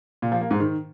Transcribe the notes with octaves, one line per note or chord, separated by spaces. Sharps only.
A#2
F3
A#3
G#2
D#3